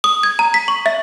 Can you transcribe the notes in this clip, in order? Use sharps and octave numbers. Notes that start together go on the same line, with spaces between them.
D#6
G#6
A#5
B6
C#6
E5